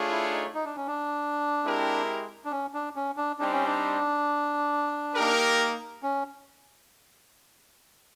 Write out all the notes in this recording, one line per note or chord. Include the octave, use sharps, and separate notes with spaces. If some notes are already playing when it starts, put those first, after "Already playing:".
Already playing: A3 D4 F4 G#4 C#5
E4
D#4
D#4
D4
C#4
D4
G#3 C4 E4 G4 A#4
D4
C#4
D4
C#4
D4
G3 C4 D4 D#4 G4 C5
C#4
D4
A#3 D#4 G4 A#4
C#4